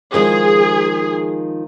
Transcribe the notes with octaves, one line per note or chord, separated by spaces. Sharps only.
D#3 F3 G#3 G#4